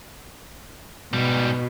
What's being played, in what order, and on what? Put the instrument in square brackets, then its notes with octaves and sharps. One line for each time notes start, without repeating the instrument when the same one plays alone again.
[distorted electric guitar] G#2 G3 [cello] B2